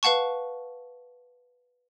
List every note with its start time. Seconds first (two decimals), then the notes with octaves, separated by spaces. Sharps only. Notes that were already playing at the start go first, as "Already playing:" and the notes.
0.03 B4 F5 F#5 A5 C#6